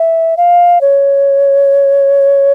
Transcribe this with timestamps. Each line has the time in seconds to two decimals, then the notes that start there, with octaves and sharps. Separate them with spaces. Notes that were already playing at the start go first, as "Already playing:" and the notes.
Already playing: E5
0.37 F5
0.81 C#5